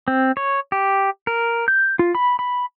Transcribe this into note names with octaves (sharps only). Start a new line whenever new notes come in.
C4
C#5
G4
A#4
G6
F4
B5
B5